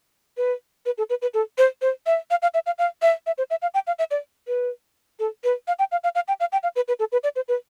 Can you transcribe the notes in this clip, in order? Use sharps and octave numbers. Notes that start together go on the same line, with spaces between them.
B4
B4
A4
B4
B4
A4
C5
C5
E5
F5
F5
E5
F5
F5
E5
E5
C5
E5
F5
G5
F5
E5
D5
B4
A4
B4
F5
G5
F5
F5
F5
G5
F5
G5
F5
B4
B4
A4
B4
D5
C5
B4